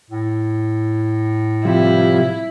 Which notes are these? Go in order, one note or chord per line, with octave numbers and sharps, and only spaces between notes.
A2
C3 F3 G3 E4